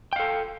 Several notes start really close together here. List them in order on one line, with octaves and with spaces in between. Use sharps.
G5 F5 A4